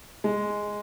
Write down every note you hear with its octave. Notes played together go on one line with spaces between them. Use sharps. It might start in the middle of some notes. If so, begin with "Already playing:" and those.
G#3